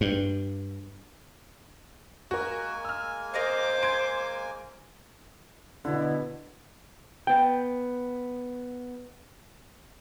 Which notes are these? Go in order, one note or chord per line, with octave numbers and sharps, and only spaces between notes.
G2
G#3 A#3 F#4 A#4 G#5
E6 F6
A#4 C5 D#5 F5 D6
C6 G#6 D7
B2 D3 E4
B3 G5